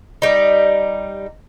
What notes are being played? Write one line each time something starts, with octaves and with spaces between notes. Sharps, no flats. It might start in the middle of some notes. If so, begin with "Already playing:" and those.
G3 D#4